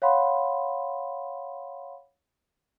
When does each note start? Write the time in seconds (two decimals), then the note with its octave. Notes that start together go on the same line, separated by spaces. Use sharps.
0.02 C#5 F5 F#5 B5 C6